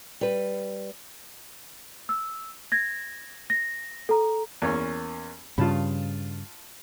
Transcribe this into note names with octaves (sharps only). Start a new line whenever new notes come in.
G3 B4
E6
G#6 A#6
A#6
A4 A#5
E2 A#3 C#4
G2 C#3 F4 A5 B5